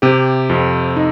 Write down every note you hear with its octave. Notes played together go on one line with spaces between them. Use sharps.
C3 G4
F2
D#4